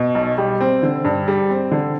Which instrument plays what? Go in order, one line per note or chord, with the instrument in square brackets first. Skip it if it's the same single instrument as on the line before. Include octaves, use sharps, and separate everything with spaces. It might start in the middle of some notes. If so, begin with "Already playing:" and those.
Already playing: [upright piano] B2
B1
G3
C4
D3
G2
G3
C4
D3